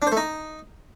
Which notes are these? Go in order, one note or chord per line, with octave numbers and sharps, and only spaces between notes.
D4
C5
A3
D#4